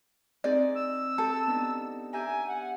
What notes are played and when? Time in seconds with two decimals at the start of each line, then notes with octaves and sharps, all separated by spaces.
0.44 C4 D#4 G#4 D5
0.75 E6
1.18 G4 A4
1.47 B3 D4 D#4
2.13 G4 E5 G#5 A#5
2.48 F#5